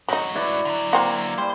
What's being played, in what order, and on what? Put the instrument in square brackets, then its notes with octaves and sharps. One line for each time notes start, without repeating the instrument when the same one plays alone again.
[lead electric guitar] G#2 F#4 [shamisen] F#3 D#4
[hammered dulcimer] E4 B4 D5
[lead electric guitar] D3 F#3
[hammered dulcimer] A#3 [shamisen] C4 F#4
[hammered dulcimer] G3 [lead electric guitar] C5